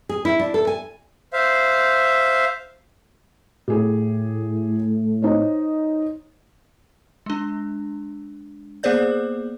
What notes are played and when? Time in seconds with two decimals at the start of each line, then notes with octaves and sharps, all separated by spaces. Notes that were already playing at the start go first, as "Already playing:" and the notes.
0.09 G#4
0.25 E4
0.39 D4
0.54 A4
0.67 G#5
1.33 C5 E5 F5
3.68 A2 G4 G#4
5.22 D#4 C5 C#5
7.26 G#3 D4
8.83 A#3 B3 G#4 C5 D5 G6